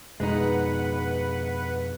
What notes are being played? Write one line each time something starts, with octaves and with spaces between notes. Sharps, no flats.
F2 B2 G#3 D#4 B4 F#5